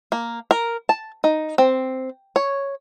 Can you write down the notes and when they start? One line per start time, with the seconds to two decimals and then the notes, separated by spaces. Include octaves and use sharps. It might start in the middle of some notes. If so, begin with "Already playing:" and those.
0.12 A#3
0.51 A#4
0.89 A5
1.24 D#4
1.58 C4
2.36 C#5